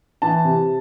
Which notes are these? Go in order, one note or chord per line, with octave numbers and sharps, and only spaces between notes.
E3 A5
C3